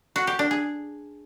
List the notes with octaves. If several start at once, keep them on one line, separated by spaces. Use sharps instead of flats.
F#4
G4
D4
G#4